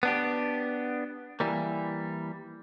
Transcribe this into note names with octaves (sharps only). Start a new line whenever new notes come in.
B3 D4 G4
E3 G3 A#3